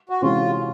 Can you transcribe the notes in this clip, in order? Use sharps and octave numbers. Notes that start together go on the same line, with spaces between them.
F#4
C3 E3 G#3 C#4 F4 F#4